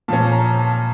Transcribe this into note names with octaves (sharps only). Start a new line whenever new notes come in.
A#2 F3 C#4 A5
A#5
A5